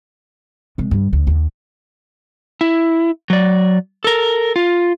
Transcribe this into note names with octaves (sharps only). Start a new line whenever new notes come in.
C2 G#3
G2 D3
D2
D#2
E4
F#3 D5
A4 A#4
F4